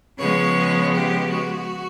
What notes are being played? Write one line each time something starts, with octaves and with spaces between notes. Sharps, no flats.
C#3 F3 G#3 B3 C#5
G4
F#4